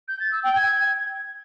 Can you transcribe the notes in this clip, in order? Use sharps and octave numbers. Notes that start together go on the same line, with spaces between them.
G6
A6
E6
G5
G#6